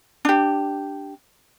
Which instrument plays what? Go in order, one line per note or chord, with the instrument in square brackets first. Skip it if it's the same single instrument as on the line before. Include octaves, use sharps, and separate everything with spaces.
[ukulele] D4 G4